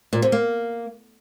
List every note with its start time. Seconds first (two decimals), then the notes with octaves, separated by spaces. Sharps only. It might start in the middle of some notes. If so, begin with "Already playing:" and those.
0.13 A#2
0.22 C3
0.32 A#3